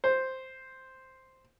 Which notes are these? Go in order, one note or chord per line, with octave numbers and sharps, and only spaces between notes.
C5